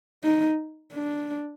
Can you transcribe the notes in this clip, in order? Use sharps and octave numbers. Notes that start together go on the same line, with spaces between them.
D#4
D4